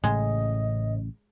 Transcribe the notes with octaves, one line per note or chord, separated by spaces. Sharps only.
A1 A2 C#3 G#3 D#5